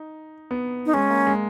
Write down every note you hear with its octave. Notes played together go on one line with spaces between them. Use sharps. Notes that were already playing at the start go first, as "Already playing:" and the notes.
Already playing: D#4
B3
D#4
G#3 C#4
A#3
G#3